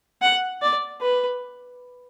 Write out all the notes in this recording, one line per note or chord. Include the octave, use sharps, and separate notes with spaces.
F#5
D5
B4